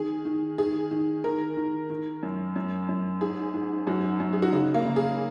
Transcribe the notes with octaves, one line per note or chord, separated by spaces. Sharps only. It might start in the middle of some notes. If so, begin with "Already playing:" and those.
Already playing: D#3 G#4
D#3
D#3 G#4
D#3
D#3 A#4
D#3
D#3
F#2
F#2
F#2
G#2 G#4
G#2
F#2 F#4
F#2
G#4
F#4
C#3 D#4
A#3
C#3
G#4